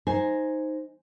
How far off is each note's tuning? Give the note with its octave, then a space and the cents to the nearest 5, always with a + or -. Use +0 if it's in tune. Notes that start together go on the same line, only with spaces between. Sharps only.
D#4 +0 C5 +0 G#5 +0